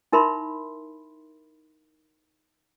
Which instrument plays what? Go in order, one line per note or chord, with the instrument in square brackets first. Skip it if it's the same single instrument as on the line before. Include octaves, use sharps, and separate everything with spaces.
[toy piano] D#4 E4 A#4 E5 B5 C6